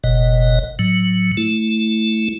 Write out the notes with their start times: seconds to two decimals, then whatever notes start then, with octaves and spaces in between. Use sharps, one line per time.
0.04 F#1 B2 D#5
0.79 A2 F#3
1.37 A3 E4